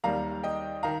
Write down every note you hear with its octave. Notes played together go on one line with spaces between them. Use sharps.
D#2 D#3 G3 F5 A#5
D#5 G5
D#3 F5 A#5